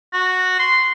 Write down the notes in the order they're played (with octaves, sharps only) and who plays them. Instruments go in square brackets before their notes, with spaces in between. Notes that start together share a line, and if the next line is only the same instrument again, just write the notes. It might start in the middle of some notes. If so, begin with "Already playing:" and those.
[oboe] F#4
C6